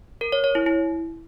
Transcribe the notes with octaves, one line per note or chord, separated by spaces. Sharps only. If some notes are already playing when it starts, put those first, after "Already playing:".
A#4
C#5
C#5
E4
E4